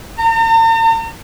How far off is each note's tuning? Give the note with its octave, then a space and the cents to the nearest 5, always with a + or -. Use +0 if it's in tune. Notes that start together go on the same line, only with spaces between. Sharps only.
A#5 -45